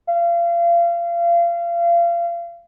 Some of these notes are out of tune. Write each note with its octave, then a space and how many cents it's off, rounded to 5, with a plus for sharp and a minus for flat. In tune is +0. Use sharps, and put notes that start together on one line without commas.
F5 -30